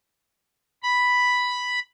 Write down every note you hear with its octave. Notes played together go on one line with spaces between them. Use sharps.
B5